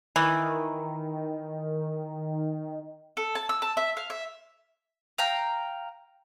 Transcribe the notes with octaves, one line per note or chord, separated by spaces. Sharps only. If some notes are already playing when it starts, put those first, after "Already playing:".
D#3 E3
A4
A5
E6
A5
E5
F5
E5
F5 G5 A#5